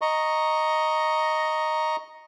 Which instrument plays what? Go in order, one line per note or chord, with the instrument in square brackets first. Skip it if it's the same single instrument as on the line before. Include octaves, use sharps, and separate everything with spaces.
[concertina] D#5 A#5 C#6